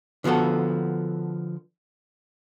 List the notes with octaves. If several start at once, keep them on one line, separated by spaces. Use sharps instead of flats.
D3 F3 B3 F#4 A4